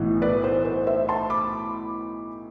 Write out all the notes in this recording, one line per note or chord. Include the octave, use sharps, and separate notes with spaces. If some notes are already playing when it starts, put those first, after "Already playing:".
Already playing: B1 A2 E3 B3
B4 D5
C5
C5
C5 E5
A5 C6
B5 D6